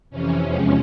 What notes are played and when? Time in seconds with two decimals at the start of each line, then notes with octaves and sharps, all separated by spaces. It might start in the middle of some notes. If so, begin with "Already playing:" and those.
0.10 F2 C3 E3 C#4
0.41 E2 C3 F3 G#3 C#4